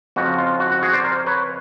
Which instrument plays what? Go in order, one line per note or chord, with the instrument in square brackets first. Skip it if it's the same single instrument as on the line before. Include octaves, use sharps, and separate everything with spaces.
[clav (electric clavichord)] F2 C#3 F3 F#4
F4
F#4
F#4
F#4 G#4
C5 D5
A#4 C5
B4 C#5